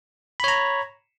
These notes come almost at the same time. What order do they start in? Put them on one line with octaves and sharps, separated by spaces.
B5 C#5 A#5